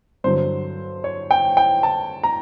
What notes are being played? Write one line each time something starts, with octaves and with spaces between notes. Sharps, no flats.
G2 D3 F#3 C5
C#5
G5
G5
A5
A#5